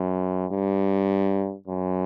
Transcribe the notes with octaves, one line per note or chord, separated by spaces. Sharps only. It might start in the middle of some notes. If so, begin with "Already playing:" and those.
Already playing: F#2
G2
F#2